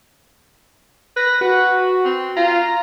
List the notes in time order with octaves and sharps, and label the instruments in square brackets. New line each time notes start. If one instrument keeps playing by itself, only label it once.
[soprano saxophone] B4 [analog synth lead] A#6
[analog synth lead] F#4 [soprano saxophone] B4
[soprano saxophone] C4
[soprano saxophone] F4 [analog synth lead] A#5